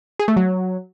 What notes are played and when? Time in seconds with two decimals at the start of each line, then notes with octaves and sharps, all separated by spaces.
0.19 G#4
0.28 A3
0.36 F#3